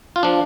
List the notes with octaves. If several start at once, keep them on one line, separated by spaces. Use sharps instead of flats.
F4
F3 D4